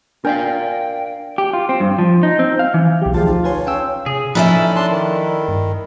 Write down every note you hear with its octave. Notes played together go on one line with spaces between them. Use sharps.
D4 A#4 D5 F5 G5
G4
F4
C4
G2
F3
D#4
C4
F5
E3
B1 F#3 G4
D2 F3 F4 G#4 A5
D#4
B4 C#5 G#5 C6
C#4 F5 G5 E6
C3 G#4
F3 C#4 D#4 E4 A4 B4 D5 E5
D4 A5 C6
D#3
G2